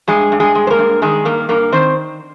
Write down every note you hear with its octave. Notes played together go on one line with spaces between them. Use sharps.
G2 G#3 G#4
G2
G#3 G#4
G#3
C5
A#3 A#4
G2
D#3 G#3 G#4
G2 A#3 A#4
G2 A#3 A#4
D#3 C4 C5